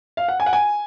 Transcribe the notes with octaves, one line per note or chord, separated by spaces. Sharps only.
F5
F#5
G#5
F#5
G#5